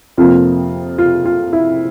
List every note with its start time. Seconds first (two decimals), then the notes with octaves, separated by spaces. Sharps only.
0.18 F2 C3 F3 A#3 F4
0.98 F4
1.25 F4
1.53 E4